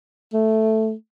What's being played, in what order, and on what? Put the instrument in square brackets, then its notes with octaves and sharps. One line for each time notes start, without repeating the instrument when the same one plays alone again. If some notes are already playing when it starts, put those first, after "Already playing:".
[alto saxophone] A3